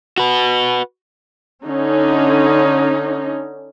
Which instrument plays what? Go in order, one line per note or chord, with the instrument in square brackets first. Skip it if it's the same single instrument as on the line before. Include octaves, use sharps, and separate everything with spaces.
[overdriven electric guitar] F#4 B4
[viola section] D3 C#4 D#4